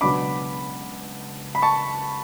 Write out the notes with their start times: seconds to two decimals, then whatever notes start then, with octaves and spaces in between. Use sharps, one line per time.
0.01 C#2 B2 F#3 B3 D4 B5 D6
1.55 B5
1.62 A5 C#6